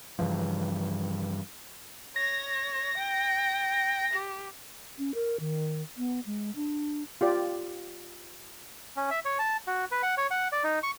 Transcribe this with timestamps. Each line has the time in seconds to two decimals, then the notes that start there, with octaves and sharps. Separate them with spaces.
0.19 G2 C#3 E3 F3
2.16 C#5 A#6
2.97 G5
4.13 G4
4.98 C#4
5.15 A#4
5.40 D#3
5.97 B3
6.26 G#3
6.56 D4
7.21 F4 G4 D5
8.96 C#4
9.10 E5
9.25 C#5
9.39 A5
9.67 F#4
9.91 B4
10.03 F#5
10.17 C#5
10.31 F#5
10.52 D5
10.64 D#4
10.83 C#6